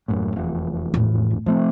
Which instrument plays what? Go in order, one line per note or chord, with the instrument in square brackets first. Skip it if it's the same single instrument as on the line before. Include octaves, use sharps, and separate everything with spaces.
[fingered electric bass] D#1 F#2 A2
F1 E2
[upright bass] A2
[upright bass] C3 [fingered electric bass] F3 A3 C4